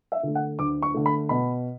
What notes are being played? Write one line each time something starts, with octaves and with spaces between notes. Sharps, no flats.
E5
D3 A3
F#5
D2 D6
C#6
D3 A3
B5
B2 B5